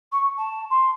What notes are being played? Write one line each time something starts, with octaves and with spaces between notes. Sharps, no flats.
C#6
A5
C6